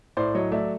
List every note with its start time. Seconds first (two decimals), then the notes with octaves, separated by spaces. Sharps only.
0.17 A2 C5 D5
0.35 F#3 C#5 D#5
0.52 A3 D5 E5